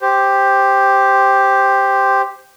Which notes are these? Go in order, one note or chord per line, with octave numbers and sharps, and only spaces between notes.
G4 C5